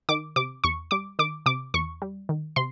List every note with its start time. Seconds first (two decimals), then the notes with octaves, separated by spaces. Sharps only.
0.09 D#3 D6
0.36 C3 D6
0.64 E2 C#6
0.91 G3 D6
1.19 D#3 D6
1.46 C3 D6
1.74 E2 C#6
2.02 G3
2.29 D#3
2.56 C3 C6